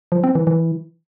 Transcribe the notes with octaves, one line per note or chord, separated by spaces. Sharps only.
F3
C4
E3
E3